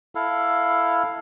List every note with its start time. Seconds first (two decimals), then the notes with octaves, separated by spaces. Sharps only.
0.15 E4 A4 F5